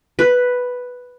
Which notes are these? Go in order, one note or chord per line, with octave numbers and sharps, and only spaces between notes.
B4